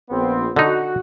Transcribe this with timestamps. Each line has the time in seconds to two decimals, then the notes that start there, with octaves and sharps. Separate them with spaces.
0.10 A#1 B3 C4
0.56 D3 D#4 F#4